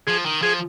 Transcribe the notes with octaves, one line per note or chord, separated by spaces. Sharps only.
F3 G#4
D#3
F3 G#4